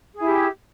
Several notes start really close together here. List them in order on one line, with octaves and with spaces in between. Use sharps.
G#4 E4 G4